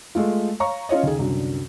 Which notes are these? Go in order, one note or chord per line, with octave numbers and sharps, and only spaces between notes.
G#3 A3 F4
C#5 F5 A#5 C#6
C#4 F4 C#5 D#5
D#2 C#3 G#4
C2 F#2 D3